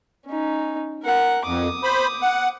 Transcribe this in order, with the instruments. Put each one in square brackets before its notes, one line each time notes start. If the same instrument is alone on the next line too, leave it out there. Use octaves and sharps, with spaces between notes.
[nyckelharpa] C#4 D#4
A#4 F#5
[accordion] F2 [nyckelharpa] D6 D#6
[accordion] C5 B5
F#5